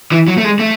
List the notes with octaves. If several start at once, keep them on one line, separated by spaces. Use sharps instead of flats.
E3
F#3
A3
G#3
A3